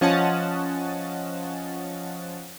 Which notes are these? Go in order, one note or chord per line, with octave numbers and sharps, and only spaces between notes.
F3 C#4 D#5 F#5 A5 A6